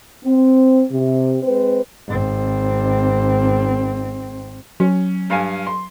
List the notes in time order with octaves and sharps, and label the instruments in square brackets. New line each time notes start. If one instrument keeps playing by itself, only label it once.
[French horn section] C4
C3
G#3 C4 B4 C5
[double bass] G#1 C4
[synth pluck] F#3 [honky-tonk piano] C#4
[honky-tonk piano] G2 F5 G#5
C6